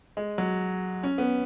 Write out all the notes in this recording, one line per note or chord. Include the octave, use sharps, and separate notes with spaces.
G#3
F#3
C#4
B3